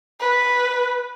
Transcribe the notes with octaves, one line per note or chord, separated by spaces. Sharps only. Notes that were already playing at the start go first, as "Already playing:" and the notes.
B4